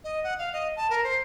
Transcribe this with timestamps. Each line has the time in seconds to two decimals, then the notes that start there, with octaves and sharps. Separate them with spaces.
0.04 D#5
0.24 F#5
0.38 F5
0.53 D#5
0.76 A5
0.90 A#4
1.04 C5